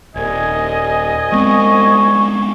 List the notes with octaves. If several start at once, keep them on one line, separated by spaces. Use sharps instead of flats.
D#1 C2 D#5 G#5
G#3 B3 C4 C#6